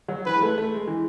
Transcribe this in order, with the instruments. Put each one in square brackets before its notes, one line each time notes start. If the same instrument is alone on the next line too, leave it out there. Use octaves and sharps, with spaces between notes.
[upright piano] F#3
[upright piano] E3 [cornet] B4
[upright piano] G#3
A3
A3
G#3
E3